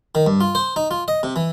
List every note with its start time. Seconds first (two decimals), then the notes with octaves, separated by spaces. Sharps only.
0.15 D#3
0.27 G2
0.41 F4
0.55 C5
0.76 D#4
0.91 F4
1.08 D#5
1.23 C3
1.36 E3